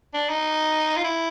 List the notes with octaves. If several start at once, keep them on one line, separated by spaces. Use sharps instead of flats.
D4
D#4
F4
E4